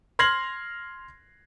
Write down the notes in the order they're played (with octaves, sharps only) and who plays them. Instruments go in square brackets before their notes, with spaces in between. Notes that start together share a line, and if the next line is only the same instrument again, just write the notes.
[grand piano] C6 F6 G#6 A#6 C7 F#7